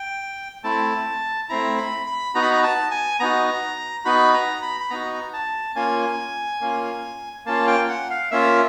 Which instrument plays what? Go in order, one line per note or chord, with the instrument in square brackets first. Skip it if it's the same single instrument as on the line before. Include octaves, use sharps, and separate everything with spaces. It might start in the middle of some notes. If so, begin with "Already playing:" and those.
Already playing: [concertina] G5
A3 C4 E4 A5
A3 C4 E4 A#5
B5
B5
B3 D#4 F#4 A#5
B5
A#5
A5
G#5
B3 D#4 F#4 A#5
B3 D#4 F#4 B5
A#5
B5
B5
B3 D#4 F#4 A#5
A5
A#3 C#4 F4 G#5
A#3 C#4 F4
A#3 C#4 F4 A5
G5
F#5
F5
A#3 C#4 F4 E5